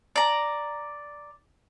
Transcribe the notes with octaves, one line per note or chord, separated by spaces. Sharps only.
D5 A#5